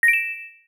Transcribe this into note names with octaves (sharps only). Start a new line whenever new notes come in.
A#6
D7
E7